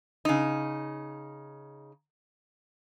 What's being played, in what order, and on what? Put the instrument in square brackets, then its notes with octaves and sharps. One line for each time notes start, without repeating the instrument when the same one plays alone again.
[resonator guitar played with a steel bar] C#3 D#4